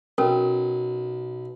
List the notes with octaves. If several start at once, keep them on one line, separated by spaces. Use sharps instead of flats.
B1 C#4 A4 A#4